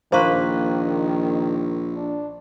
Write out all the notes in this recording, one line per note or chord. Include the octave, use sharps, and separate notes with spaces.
A#1 D#3 A#3 B4 C5 C6 C#6
D4